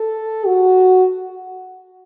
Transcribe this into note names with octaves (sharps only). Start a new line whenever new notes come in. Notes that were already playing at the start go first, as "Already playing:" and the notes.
Already playing: A4
F#4